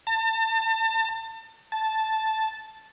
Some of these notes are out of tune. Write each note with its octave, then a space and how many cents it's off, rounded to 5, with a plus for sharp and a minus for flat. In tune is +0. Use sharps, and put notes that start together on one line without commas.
A5 +35
A5 -5